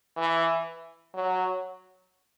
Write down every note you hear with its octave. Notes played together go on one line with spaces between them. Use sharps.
E3
F#3